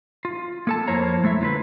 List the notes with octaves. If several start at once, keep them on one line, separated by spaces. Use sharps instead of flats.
F4
A#3 A4 A5
F2 A#3 E4 C5 C#5 A#5
G#3 A3 E4 E5
D3 F4 B4